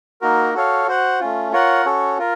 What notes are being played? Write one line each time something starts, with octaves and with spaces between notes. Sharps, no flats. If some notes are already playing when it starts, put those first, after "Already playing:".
A#3 D#4 F#4 A#4
F#4 A4 C#5 F5
F#4 C5 F#5
A3 C#4 F4
F4 A#4 C#5 F#5
C#4 F#4 A4 C#5
F4 A#4